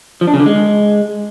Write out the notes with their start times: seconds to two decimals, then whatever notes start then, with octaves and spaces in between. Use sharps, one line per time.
0.21 F3
0.27 D4
0.34 C#3
0.40 D3
0.46 G#3